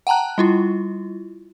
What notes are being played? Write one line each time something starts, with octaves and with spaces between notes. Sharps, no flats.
F#5 G5 A5 A#5 F#6
G3 E4 F4